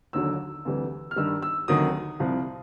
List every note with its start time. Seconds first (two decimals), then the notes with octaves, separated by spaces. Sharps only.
0.13 D#2 D3 F#3 E6
0.65 D2 C3 E3 G3
1.11 F6
1.16 G2 D#3 G3 E6
1.42 E6
1.68 D2 C3 D#3 F#3 D#6
2.20 C2 C3 F3